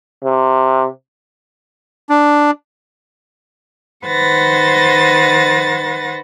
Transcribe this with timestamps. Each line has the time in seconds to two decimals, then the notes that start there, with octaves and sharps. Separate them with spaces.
0.24 C3
2.10 D4
4.06 D#3 B4 C5 F#5 A6 A#6